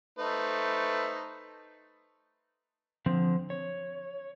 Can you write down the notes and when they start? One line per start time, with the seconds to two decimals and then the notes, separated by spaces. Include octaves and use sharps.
0.19 A3 D#4 B4 C5
3.06 D3 F3 C4
3.50 C#5